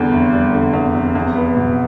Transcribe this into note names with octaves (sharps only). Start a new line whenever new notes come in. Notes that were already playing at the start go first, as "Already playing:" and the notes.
Already playing: E2 D3 G3
F1
G3
D3
E2
F1
E2
B3
B2